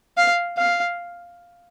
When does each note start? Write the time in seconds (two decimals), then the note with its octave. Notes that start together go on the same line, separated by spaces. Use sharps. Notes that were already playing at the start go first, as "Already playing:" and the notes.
0.17 F5
0.58 F5